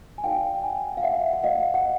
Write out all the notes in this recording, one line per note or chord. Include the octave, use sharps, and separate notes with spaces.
G#5
D#4 F#4 A#4 D5 F5 G5
G5
F#5 G#5
F5
E5 F#5
F#5
D#5 F5
F#5